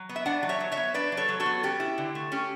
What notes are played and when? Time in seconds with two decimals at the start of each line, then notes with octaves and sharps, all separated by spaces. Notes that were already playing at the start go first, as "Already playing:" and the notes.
Already playing: F#3
0.09 B3
0.16 E5
0.26 D4 D5 F#5
0.43 F#3
0.49 C#5 E5
0.60 F#3
0.72 C#5 E5
0.77 B3
0.94 D4 B4 D5
1.12 F#3
1.17 A4 C#5
1.29 F#3
1.40 F#4 A4
1.46 B3
1.63 C#4 G4
1.80 E4
1.98 D3
2.15 A3
2.32 C#4 G4